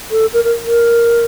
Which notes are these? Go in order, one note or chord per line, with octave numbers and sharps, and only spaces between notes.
A4
A#4
A#4
A#4